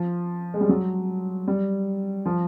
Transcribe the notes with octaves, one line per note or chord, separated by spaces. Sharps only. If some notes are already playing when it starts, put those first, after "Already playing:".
Already playing: F3
G#3
G3
F#3
G3
F3